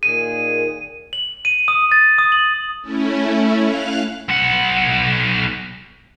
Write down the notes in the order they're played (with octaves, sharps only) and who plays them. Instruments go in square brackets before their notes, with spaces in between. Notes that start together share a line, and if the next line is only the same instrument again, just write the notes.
[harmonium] A#2 D#3 G#4 [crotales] D#7
[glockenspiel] F#7
D#7
D#6
A6
D#6
F#7
[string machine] A3 C#4 E4
F5 F6 F#6
[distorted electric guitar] B1 F#5